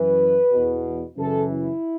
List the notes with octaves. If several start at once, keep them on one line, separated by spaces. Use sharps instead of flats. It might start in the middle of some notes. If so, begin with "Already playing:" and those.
Already playing: F#2 E3 B4
E2 B2
F#2 C#3 E3 A4
E4